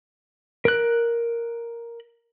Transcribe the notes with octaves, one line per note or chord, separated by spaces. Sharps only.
A#4 F#6